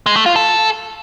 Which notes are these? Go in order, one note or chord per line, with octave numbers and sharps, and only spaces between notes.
G#3
A3
F4
A4